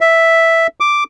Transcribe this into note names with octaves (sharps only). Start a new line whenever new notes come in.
E5
D6